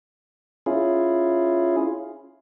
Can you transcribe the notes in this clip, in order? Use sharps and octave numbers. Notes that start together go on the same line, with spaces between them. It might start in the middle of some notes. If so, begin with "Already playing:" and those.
C#4 E4 F4 G#4